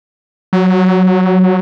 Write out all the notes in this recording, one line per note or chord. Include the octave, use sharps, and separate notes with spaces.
F#3